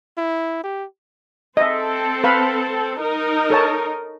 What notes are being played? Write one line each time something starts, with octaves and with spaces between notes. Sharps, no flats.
E4
G4
C4 A4 D#5 E5
B4 F5 B5
D#4 A#4
A4 C#5 A5